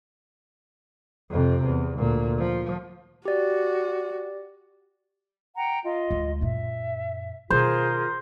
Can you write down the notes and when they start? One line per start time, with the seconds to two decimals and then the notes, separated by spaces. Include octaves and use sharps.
1.31 F2 C3
1.66 E2
1.98 D2 A#2
2.39 F3
3.25 F#4 G4 D5
5.55 F#5 G5 A#5
5.84 F4 D#5
6.11 D2 G#3
6.41 F#2 A#2 E5
7.50 B2 D#3 F4 G#4 A#4 C5